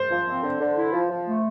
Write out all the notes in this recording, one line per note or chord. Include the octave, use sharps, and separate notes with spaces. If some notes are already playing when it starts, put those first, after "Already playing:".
Already playing: C5
F3
C4
D3
D3
E4
F3
F3
A3